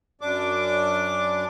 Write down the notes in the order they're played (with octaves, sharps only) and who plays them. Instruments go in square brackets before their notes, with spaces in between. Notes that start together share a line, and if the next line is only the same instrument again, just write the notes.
[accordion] F#2 D4 D6